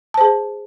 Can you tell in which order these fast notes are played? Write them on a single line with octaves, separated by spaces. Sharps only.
A5 C5 G#4